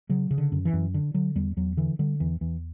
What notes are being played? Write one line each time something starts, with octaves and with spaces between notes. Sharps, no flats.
C#3 F#3
C#3
D3
F#2
E3
F#2
D3
D3 F#3
E2 G3
E2 F#3
D3 E3
D3 G3
E2 E3
E2 E3